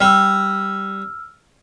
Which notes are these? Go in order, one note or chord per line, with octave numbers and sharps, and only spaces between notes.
G3 E6 F6